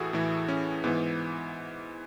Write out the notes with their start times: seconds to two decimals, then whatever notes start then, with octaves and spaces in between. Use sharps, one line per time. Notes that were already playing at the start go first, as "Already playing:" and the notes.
Already playing: A2 E3 F#4 G#4 A4
0.13 A2 E3 E4
0.48 C#4
0.84 G#2 E3 B3